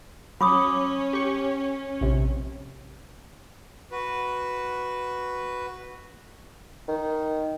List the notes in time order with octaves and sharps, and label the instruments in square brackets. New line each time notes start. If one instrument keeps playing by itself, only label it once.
[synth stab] F#3 [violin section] C#4 [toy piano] B5 D6 D#6
[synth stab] G4 C#6
A#1 C3
[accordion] F#4 B4
[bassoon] D#3